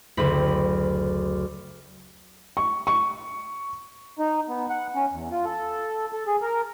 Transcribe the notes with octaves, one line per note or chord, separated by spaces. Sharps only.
F#1 D2 C4 B5
C#6
C#6
D#4
B3
F#5
C#4
E2
F4
A4
A4
G#4
A#4